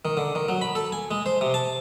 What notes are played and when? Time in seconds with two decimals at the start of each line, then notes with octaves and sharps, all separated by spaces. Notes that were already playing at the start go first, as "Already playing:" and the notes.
0.05 D#3
0.17 D3
0.35 D#3
0.49 F#3
0.61 B5
0.75 A4
0.92 G#5
1.11 G#3
1.26 C5
1.41 C3
1.54 A5